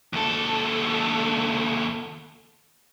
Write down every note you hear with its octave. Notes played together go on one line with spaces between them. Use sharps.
D#2 A4